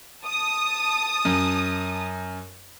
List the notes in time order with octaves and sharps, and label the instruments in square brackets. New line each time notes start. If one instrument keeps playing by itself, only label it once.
[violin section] A5 D#6
[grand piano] F#2